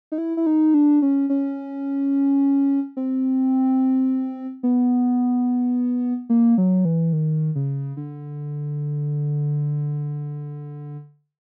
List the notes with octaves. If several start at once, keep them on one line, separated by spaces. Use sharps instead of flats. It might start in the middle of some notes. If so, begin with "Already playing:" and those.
D#4
E4
E4
D#4
D4
C#4
C#4
C4
B3
A#3
F#3
E3
D#3
C#3
D3